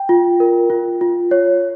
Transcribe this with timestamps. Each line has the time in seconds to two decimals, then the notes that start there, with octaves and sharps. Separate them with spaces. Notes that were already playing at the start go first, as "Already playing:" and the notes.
Already playing: G5
0.09 F4
0.40 A#4
0.70 F4
1.01 F4
1.31 C#5